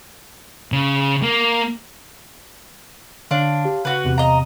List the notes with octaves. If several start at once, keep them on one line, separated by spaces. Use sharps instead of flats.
C#3
A#3
D3 D4 C#5 F5 C6
G4
C#3 F#4 B4
E2 C3
D#5 F5 A#5